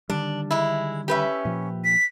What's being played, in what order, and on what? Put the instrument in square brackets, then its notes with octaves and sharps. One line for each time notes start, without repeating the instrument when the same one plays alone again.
[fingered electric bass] D3 D#3 G3 [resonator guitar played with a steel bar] D4
[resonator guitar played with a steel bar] G#3 E4
[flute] C#4 [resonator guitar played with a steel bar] G4 B4 E5
[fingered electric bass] A#2 F3
[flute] B6